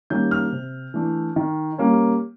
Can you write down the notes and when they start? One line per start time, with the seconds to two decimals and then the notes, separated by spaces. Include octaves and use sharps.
0.10 D#3 G3 A#3 C#4 G6
0.31 F6
0.52 C3
0.94 E3 A3 D4
1.36 D#3
1.78 G3 A#3 C#4